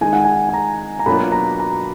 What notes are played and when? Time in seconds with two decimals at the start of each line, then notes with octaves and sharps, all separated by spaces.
0.01 D#3 G#3 D#4 G#5
0.13 F#5
0.24 G#5
0.49 G#5
0.53 A#5
0.99 A#5
1.06 B2 F#3 A#3 D4 F4 B5
1.32 A#5
1.59 A#5